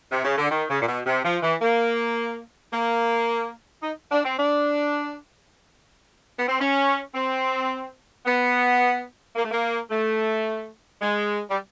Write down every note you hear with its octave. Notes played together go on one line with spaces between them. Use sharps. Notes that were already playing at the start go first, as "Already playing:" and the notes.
C3
C#3
D3
D#3
C#3
A#2
B2
C3
F3
E3
A#3
A#3
D#4
D4
C4
D4
B3
C4
C#4
C4
B3
A#3
A3
A#3
A3
G#3
G3